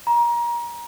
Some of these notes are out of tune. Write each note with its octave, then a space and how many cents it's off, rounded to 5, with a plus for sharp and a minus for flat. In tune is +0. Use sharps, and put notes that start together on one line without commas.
A#5 +25